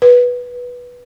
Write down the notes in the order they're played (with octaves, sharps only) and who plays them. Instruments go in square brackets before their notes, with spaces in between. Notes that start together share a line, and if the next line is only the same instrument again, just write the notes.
[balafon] B4